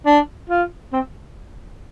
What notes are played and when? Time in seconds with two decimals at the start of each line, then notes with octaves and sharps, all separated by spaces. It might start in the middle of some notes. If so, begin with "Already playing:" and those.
0.06 D4
0.50 F4
0.93 C4